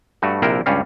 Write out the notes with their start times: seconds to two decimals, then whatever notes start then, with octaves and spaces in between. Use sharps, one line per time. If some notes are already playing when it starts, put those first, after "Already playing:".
0.22 G2 A3 F#4
0.42 A#1 C3 E4 A#4 F5 G5
0.66 C#2 G2 G3 C#4 F5